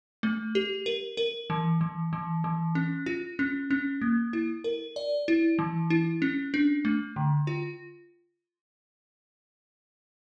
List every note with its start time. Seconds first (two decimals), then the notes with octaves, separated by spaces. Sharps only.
0.23 A3
0.55 G4
0.86 A#4
1.17 A#4
1.50 E3
1.81 E3
2.13 E3
2.44 E3
2.75 C#4
3.06 F4
3.39 C#4
3.71 C#4
4.01 A#3
4.33 E4
4.64 A#4
4.96 D5
5.28 E4
5.59 E3
5.90 E4
6.22 C#4
6.54 D4
6.85 A3
7.16 D3
7.47 F4